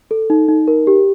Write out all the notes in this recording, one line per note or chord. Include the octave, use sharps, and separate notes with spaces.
A4
D#4
D#4
A#4
G4